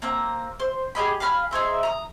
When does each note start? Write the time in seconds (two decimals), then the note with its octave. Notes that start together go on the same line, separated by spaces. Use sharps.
0.02 A#3 C4 A#5
0.60 C5
0.95 G4 G#4 D#5 B5
1.20 F5 G#5 B5 F6
1.51 D#4 G#4 C5 E5
1.83 A#5 D#6